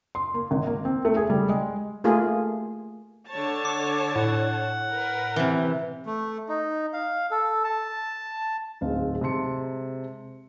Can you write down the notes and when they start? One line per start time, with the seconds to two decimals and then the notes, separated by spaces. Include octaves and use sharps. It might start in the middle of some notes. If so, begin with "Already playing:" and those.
0.15 C6
0.34 A#3
0.51 G#1
0.67 A#3
0.85 C4
1.05 A3
1.17 G#4
1.30 G3
1.49 G#3
2.04 A3 A#3 F4 G4 G#4
3.29 D3 C#5 A5
3.65 D6
4.16 A2 F#5
4.91 A#4 B4
5.36 C3 E3
6.06 A3
6.49 D#4
6.93 F5
7.31 A4
7.64 A5
8.81 D1 G#2 G#3 C4 F5
9.21 C3 G#3 A5 C6 C#7